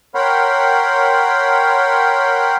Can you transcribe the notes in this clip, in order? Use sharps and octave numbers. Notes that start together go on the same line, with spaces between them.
A#4 C#5 F#5 G5 B5 C6